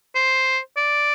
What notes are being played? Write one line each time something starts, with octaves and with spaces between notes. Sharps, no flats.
C5
D5